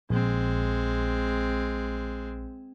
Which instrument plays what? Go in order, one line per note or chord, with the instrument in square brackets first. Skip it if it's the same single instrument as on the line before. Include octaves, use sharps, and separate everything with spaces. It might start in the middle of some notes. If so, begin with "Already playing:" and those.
[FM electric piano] A#1 [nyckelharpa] G#3 C4